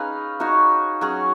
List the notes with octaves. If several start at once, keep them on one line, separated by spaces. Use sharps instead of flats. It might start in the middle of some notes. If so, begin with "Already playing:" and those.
Already playing: C#4 D#4 G#4 B4 F5
D#4 F#4 C#5 F5
F#3 C#4 G#4